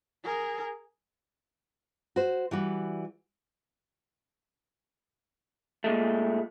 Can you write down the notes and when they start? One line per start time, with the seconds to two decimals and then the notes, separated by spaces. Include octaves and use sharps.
0.24 G#4 A#4
2.16 F#4 C5
2.51 E3 G3 F#4
5.84 A#2 G#3 A3